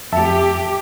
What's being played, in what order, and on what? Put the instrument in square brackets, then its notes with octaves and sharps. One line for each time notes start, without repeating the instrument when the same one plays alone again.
[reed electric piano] F2 E5 A5 [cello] G4